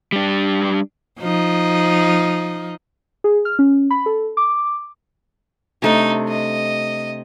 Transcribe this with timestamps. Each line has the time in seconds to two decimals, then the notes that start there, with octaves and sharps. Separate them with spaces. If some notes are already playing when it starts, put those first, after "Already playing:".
0.12 G3 D4
1.20 F3 D#4
3.24 G#4
3.45 F6
3.59 C#4
3.91 B5
4.06 A4
4.37 D6
5.82 C3 A3 D4 D#4
6.29 D#5